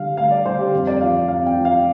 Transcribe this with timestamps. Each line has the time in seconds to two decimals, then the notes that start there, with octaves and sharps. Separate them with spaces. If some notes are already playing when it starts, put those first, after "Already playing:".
Already playing: D3 G3 F5
0.17 D2 F5
0.31 D5
0.45 D3 G3 C5
0.58 G4
0.73 F2
0.87 D5
1.01 F3 F5
1.28 F2 F5
1.46 G5
1.56 F3
1.65 F5